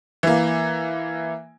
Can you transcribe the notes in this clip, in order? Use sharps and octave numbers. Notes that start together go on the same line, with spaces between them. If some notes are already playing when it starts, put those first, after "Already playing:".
E3 A#3